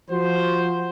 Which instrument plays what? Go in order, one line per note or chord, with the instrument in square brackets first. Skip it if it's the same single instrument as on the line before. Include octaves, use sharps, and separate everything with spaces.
[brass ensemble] F3 F#4 C5